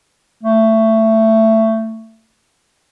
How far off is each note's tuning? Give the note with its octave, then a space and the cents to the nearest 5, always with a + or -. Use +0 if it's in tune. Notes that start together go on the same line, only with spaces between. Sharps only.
A3 +15